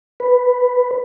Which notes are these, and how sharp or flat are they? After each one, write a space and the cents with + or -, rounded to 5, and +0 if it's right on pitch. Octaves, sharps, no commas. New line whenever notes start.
B4 +5